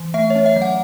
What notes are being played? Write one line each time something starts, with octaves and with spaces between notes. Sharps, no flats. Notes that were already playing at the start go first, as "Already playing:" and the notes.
Already playing: E3
A3 E5
C#5
C#4
E5
F#3
F#5